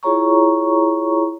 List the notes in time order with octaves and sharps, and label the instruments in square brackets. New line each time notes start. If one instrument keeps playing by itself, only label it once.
[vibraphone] E4 F4 G#4 C#5 A#5 C#6